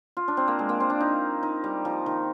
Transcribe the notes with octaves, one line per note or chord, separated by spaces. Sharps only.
F4
D4
C4
A#3
G#3
A#3
C4
D4
D#4
D#4
G3
F3
D#3